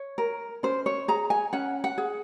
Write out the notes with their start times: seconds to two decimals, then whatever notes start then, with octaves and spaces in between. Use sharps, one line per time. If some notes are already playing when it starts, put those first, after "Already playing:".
Already playing: C#5
0.18 A#4
0.63 C#4 C5
0.86 C#5
1.08 G#4 A#5
1.30 G#5
1.53 C#4 F#5
1.84 F#5
1.98 G#4